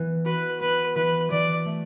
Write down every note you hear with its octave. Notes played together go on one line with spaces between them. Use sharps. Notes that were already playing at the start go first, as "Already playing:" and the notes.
Already playing: E3 B3
F#4 B4
B3 B4
E3 B4
E3 D5
A3